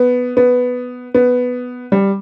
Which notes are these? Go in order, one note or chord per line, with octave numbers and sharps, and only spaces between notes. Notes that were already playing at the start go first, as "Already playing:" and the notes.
Already playing: B3
B3
B3
G3